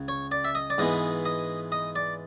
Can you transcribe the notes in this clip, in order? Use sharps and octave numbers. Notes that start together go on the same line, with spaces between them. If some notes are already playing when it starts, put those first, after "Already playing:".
Already playing: C#2 C#3
C#5
D5
E5
D#5
D5
G#2 E3 G#3 B3 D#5
D#5
D#5
D5